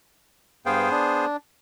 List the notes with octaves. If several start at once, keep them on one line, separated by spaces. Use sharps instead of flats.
G2 B3 G#4 C5 F5 G5
D4